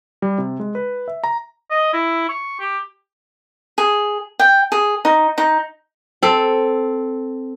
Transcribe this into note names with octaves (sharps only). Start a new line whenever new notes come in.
G3
C3
G#3
B4
E5
A#5
D#5
E4
C#6
G4
G#4
G5
G#4
D#4
D#4
C4 A4